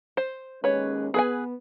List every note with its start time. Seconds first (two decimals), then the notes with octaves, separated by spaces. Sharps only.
0.17 C5
0.64 D#2 G#3 C#4 B4 C#5
1.14 B3 G#4 B4 G#5